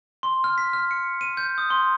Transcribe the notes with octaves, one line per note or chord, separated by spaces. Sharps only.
C6
F6
B6
F6
C#7
D#7
G6
D#6
C6